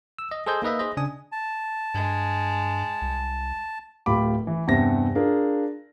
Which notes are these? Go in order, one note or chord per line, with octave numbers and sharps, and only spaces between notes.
E6
D#5
G#4 A4 C5 D#5 G#5 G6
A#3 D#4 B4 D#5 E5
G#4 C5 D#5
C#3 D4 G#5 D#6
A5
G2 G#3
C2
D1 A2 F4 G4 B5 D6
E3
E2 G2 C3 C4 E5 A#6
D4 F4 G#4 A#4